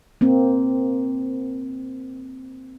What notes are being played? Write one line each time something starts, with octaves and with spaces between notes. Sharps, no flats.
A#3 C4